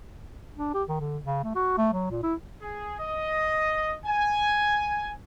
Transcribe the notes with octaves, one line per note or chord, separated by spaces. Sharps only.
D4
G4
D#3
D3
C#3
A3
F#4
A3
F#3
A#2
E4
G#4
D#5
G#5